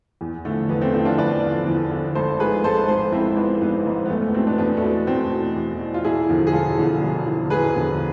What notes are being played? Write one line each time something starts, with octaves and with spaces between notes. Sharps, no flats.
E2
D3 F3 A3
E2 B3
A3 C4
D3 F3 C4 E4
D4 F4
E2 B4 D5
D3 F3
E2
D3 F3
G#1 A4 C5
G#2 F3 G#4 B4
G#1 A4 C5
G#2 F3 A4 C5
G#1 C4 E4
G#2 F3 B3
G#1 B3
G#2 F3
B3
E2 A3
A3
B3
B2 A3 C4
B3 D4
E2 B3 D4
A3
B2 B3
E2 A3 C4
B2
E2
B2
F4
E1 E4 G#4
E2 D3 F3
G#4
E1 F4 A4
E2 D3 F3
E1
E2 D3 F3
E1 G#4 B4
E2 D3 F3